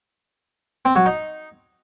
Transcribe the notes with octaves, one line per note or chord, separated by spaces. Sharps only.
C4
F#3
D#4